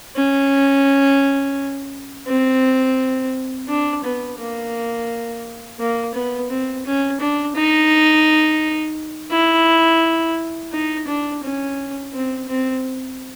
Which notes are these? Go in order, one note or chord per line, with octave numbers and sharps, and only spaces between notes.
C#4
C4
D4
B3
A#3
A#3
B3
C4
C#4
D4
D#4
E4
D#4
D4
C#4
C4
C4